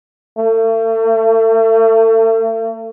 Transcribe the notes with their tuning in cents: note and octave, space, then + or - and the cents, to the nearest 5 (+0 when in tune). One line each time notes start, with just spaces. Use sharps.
A3 +40